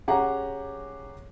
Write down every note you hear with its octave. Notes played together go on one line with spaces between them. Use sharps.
C#4 G4 G#4 F#5 A#5